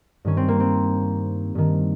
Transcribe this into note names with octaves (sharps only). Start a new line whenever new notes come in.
G2 D#3 C#4
C4
A#3
C4
G2 D#3